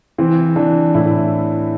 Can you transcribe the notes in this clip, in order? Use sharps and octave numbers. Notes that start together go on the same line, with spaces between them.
E3 C4
E3 D4
A2 E4